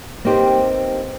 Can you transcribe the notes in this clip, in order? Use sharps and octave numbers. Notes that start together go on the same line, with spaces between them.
A#3 C4 D#4 G4 B4 C5